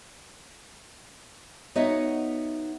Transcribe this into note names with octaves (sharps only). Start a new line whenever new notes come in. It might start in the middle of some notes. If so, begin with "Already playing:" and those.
B3 D#4 F#4 C#5 D#5 E5